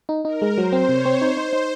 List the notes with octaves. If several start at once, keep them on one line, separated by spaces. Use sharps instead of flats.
D#4
D#4 A#4
G#3
F#3 C5
C4
C3 C#5
C4
D#4 C5
D#4
D#4